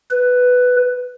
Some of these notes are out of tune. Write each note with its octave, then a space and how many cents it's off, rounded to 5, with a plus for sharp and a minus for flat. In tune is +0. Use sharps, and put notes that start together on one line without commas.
B4 +5